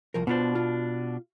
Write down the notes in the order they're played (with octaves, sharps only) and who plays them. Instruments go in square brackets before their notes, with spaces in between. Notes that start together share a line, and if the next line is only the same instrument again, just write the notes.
[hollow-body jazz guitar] C2 F3 A#4
[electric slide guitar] B2 D4 [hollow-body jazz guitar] B3 F4 C5
[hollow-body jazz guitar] F4